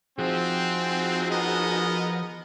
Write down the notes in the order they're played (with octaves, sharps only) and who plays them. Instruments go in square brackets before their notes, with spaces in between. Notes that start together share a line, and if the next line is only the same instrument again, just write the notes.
[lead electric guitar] F3 F4 [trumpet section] C4 [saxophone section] D#4 F#4 G#4
[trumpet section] B3 A#4 D#5